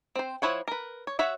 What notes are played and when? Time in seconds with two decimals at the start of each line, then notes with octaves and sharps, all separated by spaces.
0.15 C4 C5
0.42 F3 E4 C#5 F#5
0.68 A#4 B4
1.07 C#5
1.19 F#4 C#5 E5 F#5